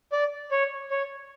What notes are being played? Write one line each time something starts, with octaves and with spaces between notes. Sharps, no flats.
D5
C#5
C#5